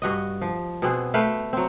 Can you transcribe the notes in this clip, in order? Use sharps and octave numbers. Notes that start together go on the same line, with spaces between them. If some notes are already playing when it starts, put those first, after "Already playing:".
G2 F#4 D#5
F3
B2 B3 C4 G#4
A3 B4 F5 G5
F#3 C4